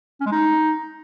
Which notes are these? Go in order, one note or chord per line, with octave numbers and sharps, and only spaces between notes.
C#4
G#3
D#4